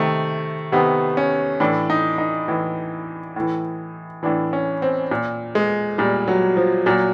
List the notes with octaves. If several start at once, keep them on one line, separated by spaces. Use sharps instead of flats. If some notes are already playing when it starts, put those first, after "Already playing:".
Already playing: C3 D#3 A3
C3 D#3 B3
C#4
A2 E3 D4
D#4
D#4
A2 E3
A2 E3
A2 E3 D4
C#4
C4
A#2
G#3
A#2 G3
F#3
F3
A#2 F#3